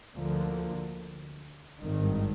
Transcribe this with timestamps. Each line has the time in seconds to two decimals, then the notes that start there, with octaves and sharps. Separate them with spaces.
0.13 D2 D3 F3 A#3
1.81 G#1 G2 D#3